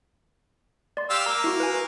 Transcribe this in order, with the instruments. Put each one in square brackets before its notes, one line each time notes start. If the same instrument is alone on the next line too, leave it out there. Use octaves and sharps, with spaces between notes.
[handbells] D5 C6
[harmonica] G4 F5 E6
[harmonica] A#3 [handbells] A#5
[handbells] E4 F#4
B4 G#5